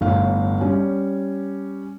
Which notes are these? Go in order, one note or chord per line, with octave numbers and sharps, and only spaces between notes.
G1 A2 F5
G3 C#4